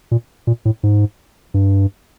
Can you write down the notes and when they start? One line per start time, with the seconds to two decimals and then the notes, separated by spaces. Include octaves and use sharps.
0.11 A#2
0.47 A#2
0.65 A2
0.83 G#2
1.54 G2